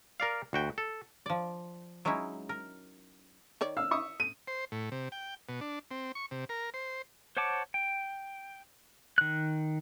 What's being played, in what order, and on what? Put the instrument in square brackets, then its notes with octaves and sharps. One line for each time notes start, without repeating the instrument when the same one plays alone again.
[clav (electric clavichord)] A#4 D5 F5
D2 F#4 G5
A4
[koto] F3 D5
F#3 G#3 C#4 D#4 E4
A#4
[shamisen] D#3 C#5 D5
[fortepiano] F5 [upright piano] E6
[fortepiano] E5 C#6 D#6
[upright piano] D#7
[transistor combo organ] C5
A2
C3
G5
B2
D4
C4
C#6
C3
A#4
C5
[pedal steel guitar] C5 C#5 F#5 A5 D6
G5
D#3 F#6